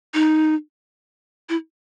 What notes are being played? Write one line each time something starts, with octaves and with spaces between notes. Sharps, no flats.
D#4
E4